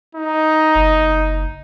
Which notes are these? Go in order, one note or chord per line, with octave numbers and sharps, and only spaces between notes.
D#4
F#1